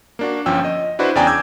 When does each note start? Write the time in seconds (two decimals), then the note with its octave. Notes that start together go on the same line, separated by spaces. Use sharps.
0.19 A#3 D4 F#4
0.46 G1 F3 C#4 G5 E6
0.65 D#5
0.99 D4 E4 F#4 B4 C5
1.15 E2 C#3 D5 G5 G#5 A#5
1.27 D6 E6 G6 G#6